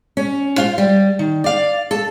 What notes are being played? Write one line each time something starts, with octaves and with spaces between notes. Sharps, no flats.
C#4
F4 C5 F5
G3
D#3
D5 F5
A4